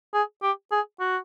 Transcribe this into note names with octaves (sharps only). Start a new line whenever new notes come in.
G#4
G4
G#4
F#4